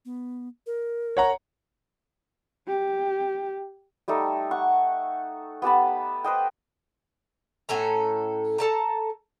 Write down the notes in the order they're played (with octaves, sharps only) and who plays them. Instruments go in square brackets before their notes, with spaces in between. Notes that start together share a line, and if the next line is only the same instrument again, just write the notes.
[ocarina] B3
A#4
[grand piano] C#5 F#5 A#5
[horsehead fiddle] G4
[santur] G3 A3 D#4 A4
F#5 C#6
B3 G4 A5 B5
B4 C5 D#5 G5
[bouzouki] A2 C#4 A4 A#5
A4 A5 A#5